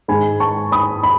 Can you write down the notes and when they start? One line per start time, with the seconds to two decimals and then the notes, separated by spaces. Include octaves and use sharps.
0.08 G#2 D#3 G#3 D#4 G#5 B5
0.40 A5 C#6
0.72 B5 D#6
1.03 B5